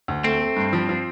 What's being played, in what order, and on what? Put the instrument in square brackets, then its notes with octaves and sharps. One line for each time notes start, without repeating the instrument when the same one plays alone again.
[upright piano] D2
[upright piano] A3 [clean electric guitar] C4
[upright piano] A3
G2
F3
F3